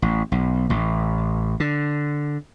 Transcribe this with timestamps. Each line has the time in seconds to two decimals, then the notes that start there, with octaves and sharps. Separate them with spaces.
0.02 A1
0.32 B1
0.70 A1
1.60 D3